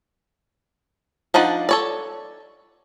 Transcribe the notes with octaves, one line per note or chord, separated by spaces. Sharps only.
F3 D4 D#4 F#5
A4 C#5 D5